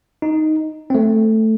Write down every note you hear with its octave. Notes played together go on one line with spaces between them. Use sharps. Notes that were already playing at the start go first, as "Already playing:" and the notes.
D#4
C4
A3